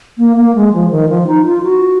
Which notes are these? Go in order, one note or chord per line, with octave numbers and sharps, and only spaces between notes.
A#3
A#3
G#3
F3
D#3
F3
D#4
F4
F#4